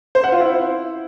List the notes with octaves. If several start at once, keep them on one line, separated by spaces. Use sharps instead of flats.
C5
F#5
F4
E4